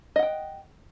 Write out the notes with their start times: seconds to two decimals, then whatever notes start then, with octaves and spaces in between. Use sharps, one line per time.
0.16 D#5
0.19 F#5
0.23 G5